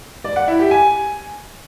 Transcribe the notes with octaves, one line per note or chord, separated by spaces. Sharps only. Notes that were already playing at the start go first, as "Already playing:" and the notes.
D5
F#5
E4
G4
G#5